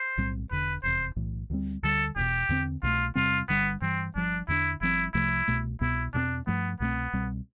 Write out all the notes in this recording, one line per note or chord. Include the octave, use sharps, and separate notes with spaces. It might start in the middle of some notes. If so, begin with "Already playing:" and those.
Already playing: C5
B1 A2 G3 C4
E1 E2 D3 B4
F1 E2 C3 C5
B1 A2 E3
D2 D3 G3 C4
D2 D3 G3 A4
E1 E2 B2 G4
E2 D3 G3 C4
C2 B2 A3 F4
E2 C3 G3 C4 F4
G1 G2 D3 G3 B3
G2 E3 G3 C4
G1 G2 F3 D4
E2 D3 A3 D4 E4
G1 G2 F3 C4 E4
C2 C3 F3 A3 E4
C2 B2 A3
C2 B2 B3 E4
E2 B2 A3 C4 D4
G2 F3 A3 B3
C2 B2 A3 B3 C4
C2 B2 G3 C4